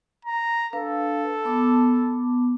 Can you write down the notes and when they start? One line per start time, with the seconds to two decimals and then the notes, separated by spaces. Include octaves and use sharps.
0.25 A#5
0.73 D4 A4 B4 F5
1.45 B3 A5 D6